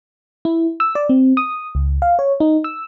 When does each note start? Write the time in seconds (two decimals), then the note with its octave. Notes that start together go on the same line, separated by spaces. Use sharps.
0.45 E4
0.80 E6
0.95 D5
1.09 C4
1.37 D#6
1.75 C#2
2.02 F5
2.19 C#5
2.40 D#4
2.64 E6